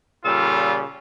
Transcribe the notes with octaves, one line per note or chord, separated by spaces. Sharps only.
A#2 C#3 G3 F4 A4